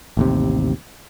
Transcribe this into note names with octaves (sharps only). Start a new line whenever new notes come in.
A1 D#2 C3